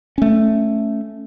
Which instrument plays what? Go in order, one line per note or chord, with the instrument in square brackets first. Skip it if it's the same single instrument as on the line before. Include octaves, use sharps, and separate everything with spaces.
[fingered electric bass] A3 C#4